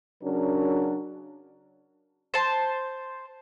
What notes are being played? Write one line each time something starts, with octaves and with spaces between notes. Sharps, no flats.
C#3 F#3 C#4 D4 F#4 A#4
C5 A5